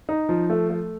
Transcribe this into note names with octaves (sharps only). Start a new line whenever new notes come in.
D#4
F3
A3
A3